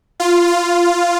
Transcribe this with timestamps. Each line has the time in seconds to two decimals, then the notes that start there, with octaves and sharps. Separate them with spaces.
0.20 F4
0.47 F4